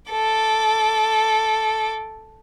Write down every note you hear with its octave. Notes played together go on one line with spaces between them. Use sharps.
A4 D6